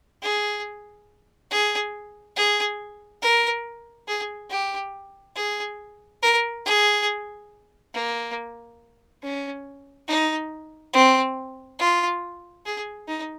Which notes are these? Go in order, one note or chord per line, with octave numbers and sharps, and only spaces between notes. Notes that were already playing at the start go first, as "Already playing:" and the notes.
G#4
G#4
G#4
A#4
G#4
G4
G#4
A#4
G#4
A#3
C#4
D#4
C4
F4
G#4
D#4